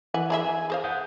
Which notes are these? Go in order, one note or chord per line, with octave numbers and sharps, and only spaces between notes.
E3 E5 F#5 G#5
E4 G#4 E5
G#5
G#4 C5 F5
F#5 D#6 G6